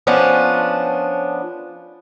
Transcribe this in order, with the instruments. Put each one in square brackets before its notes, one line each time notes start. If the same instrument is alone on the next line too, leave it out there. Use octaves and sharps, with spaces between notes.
[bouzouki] F3 B3 C#4 D4